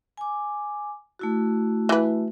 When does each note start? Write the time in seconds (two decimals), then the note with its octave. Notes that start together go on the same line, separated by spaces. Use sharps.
0.17 G#5 D6
1.19 A3 E4 F#4
1.89 E3 B4